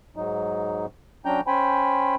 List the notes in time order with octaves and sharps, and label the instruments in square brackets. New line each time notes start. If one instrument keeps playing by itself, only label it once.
[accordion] G#2 F#3 D#4
F#3 C#4 D4 G5 A#5 G6
C#4 C5 G5 G#5 B5